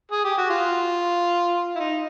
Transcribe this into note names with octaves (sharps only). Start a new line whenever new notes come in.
G#4
G4
F#4
F4
E4
D#4